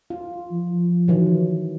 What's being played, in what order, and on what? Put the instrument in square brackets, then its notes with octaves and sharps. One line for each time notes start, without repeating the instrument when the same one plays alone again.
[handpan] F4
[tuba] F3
[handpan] D#3 E3 F#3